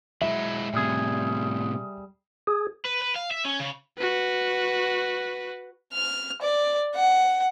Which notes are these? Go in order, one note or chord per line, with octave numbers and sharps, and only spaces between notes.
F#3 G#3 E4 E5
A2 C3 G3 G#4
G#4
B4
B4
F5
E5
C#4
C#3
F#4 B4
F6
D5
F#5